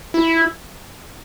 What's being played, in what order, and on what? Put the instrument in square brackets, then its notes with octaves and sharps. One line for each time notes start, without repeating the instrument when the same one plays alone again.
[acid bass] E4